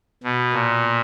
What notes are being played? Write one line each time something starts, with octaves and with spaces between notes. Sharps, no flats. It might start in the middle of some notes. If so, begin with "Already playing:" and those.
B2
A#2